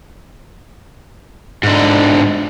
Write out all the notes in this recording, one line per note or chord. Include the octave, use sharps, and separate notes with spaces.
G#2 D3